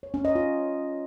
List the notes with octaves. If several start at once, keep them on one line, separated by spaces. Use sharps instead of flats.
C#5
C#4
D#5
F4